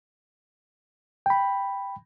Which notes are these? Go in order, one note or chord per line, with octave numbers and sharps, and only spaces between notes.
G5 B5